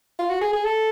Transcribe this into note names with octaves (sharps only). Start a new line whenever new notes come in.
F4
F#4
G#4
G#4
A4